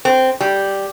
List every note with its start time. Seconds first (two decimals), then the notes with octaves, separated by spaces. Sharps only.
0.05 C4
0.40 G3